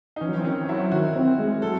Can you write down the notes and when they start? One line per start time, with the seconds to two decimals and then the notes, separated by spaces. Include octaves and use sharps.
0.16 D#4
0.21 E3 C#4
0.28 F#3
0.35 E3 C4
0.44 D#3 C#4
0.64 E3
0.69 F#3 E4
0.92 D#3 F#4
1.15 C4
1.39 G#3
1.62 F#3 A4